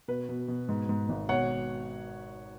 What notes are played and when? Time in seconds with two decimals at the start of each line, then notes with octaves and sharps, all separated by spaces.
0.08 B2 B4
0.29 B2
0.48 B2
0.69 G#2
0.89 G#2
1.09 G#1
1.29 B2 C#5 F#5